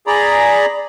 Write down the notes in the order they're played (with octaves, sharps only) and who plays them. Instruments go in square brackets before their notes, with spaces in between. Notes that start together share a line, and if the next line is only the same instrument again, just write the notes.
[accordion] G#4 D5 A#5 B5